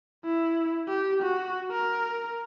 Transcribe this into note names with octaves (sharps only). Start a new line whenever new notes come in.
E4
G4
F#4
A#4